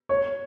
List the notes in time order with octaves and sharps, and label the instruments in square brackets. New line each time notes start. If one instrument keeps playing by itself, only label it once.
[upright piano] C#5